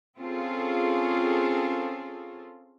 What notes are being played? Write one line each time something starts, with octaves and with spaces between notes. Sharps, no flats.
C4 C#4 F4 G#4 A4